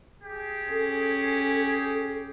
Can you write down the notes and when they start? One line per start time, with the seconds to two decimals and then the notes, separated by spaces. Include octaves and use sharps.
0.23 G4 G#4
0.70 C#4 A4